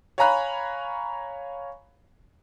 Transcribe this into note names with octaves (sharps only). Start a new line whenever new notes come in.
C#5 F5 G#5 A#5 B5 F#6